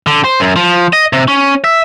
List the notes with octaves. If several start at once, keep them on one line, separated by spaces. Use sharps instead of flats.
D3
C5
F#2
F3
D#5
C3
C#4
E5